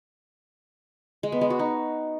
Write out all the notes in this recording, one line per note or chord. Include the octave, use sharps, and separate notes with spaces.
G#3
B3
G#3
F#4
D#4